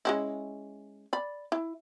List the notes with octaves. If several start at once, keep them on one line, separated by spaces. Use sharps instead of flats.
G#3 C#4 E4
D5 B5
E4